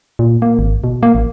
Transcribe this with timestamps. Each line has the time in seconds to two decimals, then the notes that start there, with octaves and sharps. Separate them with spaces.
0.19 A#2
0.42 A#3
0.59 G#1
0.84 B2
1.03 A#3
1.15 A1